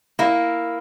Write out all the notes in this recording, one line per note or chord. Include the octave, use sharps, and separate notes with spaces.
A#3 E4